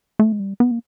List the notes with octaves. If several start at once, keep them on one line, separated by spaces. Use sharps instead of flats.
A3
G#3
G3
B3
A#3